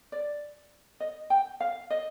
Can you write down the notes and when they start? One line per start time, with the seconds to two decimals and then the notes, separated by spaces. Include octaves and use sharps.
0.12 D5
1.00 D#5
1.30 G5
1.60 F5
1.90 D#5